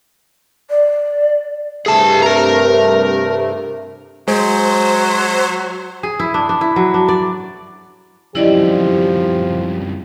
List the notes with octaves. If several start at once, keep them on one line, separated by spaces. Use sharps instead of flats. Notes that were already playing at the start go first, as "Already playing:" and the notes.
D5
G2 C3 A3 G#4 A5
A#4 A#5
F#3 G#3 C5
G#4
E4
D4
D4
E4
F#3
D4
D5
C2 F#2 F3 E4 G4 D5 D#5